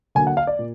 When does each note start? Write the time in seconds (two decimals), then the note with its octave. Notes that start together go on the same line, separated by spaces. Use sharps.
0.15 D3 F#3 A#3 G#5
0.27 F#5
0.37 F5
0.47 D5
0.59 A#2